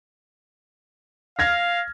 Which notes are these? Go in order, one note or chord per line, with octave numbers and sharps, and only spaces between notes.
F5 F6 G#6 A#6